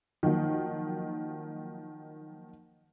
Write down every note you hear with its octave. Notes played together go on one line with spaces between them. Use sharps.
D#3 F3 F#3 A#3